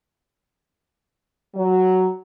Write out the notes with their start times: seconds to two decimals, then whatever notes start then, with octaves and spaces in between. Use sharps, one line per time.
1.56 F#3